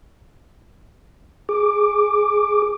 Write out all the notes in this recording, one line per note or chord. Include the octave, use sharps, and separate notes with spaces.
G#4 D6